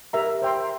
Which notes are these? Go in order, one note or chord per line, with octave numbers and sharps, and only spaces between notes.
G4 A#4 E5 A#5
C5 E5 G5 C6